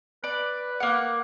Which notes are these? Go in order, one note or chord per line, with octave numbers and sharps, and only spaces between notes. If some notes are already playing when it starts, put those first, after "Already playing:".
B4 D5
A#3 F#5